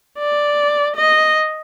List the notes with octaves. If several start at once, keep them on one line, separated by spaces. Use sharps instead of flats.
D5
D#5